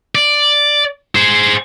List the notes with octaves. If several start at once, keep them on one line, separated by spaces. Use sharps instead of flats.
D5
G#4 C5